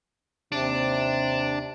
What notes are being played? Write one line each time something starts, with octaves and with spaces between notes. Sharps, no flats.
D#2 C3 D4